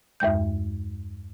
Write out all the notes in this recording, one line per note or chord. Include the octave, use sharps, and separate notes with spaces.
E2 G2 G#3 G6